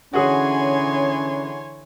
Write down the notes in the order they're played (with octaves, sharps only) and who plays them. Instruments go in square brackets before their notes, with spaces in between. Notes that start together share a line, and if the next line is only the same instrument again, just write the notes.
[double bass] D3 E3 [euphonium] C#4 [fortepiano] F#4 G#4 [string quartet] C#5 G#5 C6